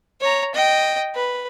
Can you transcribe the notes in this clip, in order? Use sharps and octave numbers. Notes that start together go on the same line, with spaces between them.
C#5 A#5
D#5 G5
B4